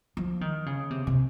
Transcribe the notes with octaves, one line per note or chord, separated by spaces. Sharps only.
F3
D#3
C#3
C3
C3